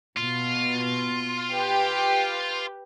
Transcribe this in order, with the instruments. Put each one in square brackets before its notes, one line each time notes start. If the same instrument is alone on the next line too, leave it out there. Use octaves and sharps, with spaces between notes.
[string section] B2 [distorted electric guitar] F4
[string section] G4 B4